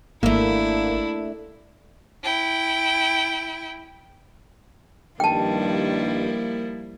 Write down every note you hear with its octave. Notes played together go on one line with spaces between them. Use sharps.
G#1 A3 A#3 D4 E4 E5
E4 G5
G2 D#3 F3 G3 A#3 E4 G5 A5